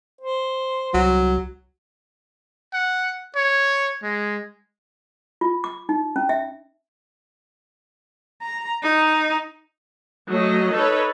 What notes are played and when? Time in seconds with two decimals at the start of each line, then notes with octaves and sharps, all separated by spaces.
0.21 C5
0.94 C2 F#3
2.73 F#5
3.36 C#5
4.03 G#3
5.41 F4
5.64 D6
5.89 D#4
6.16 C#4
6.29 E5
8.42 A#5
8.83 D#4
10.28 F#3 A3 D#5
10.72 D#4 A4 B4 C#5